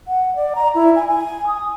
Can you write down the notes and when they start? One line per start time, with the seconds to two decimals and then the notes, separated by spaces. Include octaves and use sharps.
0.08 F#5
0.36 D5
0.55 A#5
0.75 E4
0.96 G#5
1.08 G#5
1.47 D#6